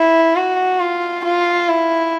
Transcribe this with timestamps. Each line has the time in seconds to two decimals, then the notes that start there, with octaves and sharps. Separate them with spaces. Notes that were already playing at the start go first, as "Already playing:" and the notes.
Already playing: E4
0.36 F#4
0.80 F4
1.25 F4
1.68 E4